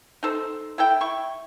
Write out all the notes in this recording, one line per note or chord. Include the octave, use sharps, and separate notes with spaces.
D#4 A4 C5
E4 A4 G5
E4 C#6